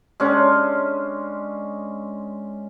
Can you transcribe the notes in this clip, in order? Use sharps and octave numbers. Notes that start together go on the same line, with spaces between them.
G#3 C#4 D4